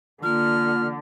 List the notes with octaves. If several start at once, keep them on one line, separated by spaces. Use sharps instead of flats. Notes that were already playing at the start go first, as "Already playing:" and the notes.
D3 A#3 F4 F6